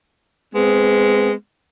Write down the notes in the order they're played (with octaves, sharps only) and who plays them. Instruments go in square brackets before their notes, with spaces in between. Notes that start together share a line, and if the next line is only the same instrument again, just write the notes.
[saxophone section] G#3 B3 C4